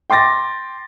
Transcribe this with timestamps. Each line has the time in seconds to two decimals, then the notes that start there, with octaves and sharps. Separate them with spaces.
0.10 G5 C6 D6 A6 A#6